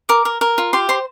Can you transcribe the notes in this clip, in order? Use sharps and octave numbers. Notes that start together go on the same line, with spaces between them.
A#4 D6
A#4
A#4
F4
G4 C6
C5 C6